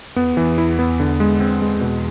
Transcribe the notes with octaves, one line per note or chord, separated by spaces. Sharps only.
F2 B3
E2
E2 E3
E4
B3
D3
G#3
C4
G#3
B2